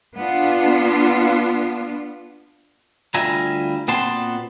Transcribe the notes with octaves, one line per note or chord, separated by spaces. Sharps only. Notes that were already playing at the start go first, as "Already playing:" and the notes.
B3 D4 F4
D2 G3 F4 E5 G#5 A#5
A#2 B3 C4 F#4 A5 C6